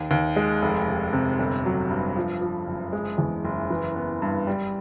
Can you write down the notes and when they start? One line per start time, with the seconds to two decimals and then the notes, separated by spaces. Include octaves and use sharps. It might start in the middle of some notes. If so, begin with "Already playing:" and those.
Already playing: D#2
0.11 D#2
0.36 G#3
0.62 F1
0.87 F1
1.13 C3
1.39 G1
1.65 F#3
1.90 G2
2.16 F3
2.41 F3
2.67 F#1
2.93 G#3
3.18 E2
3.44 F#1
3.70 E3
3.96 B3
4.22 G2
4.47 G3